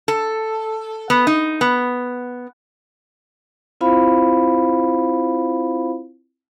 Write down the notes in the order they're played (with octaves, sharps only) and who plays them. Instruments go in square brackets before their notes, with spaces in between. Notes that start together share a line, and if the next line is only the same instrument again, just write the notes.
[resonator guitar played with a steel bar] A4
B3
D#4
B3
[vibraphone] C4 E4 F4 C5 F5 B5